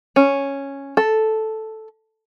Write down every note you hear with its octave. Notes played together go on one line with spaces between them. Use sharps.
C#4
A4